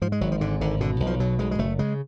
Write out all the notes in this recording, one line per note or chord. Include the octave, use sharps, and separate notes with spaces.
G#2 F3
G#3
G#1 F#3
F3
G#2 D3
G#1 D3
B2 D3
B1
F3
B2 F#3
B1 G#3
G#3
F#1 A3
C#3 G#3